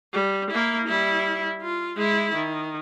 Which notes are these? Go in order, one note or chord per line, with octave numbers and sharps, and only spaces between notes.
G3
A#3 E4
G3 E4
F4
G#3 E4
D#3